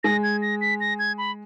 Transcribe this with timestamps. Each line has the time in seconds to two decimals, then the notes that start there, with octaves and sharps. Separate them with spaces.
0.04 G#3 A#6
0.23 G#6
0.42 A#6
0.61 B6
0.80 A#6
0.99 G#6
1.18 B5